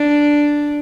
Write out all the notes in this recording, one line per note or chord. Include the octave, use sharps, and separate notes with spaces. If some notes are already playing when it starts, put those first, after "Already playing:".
Already playing: D4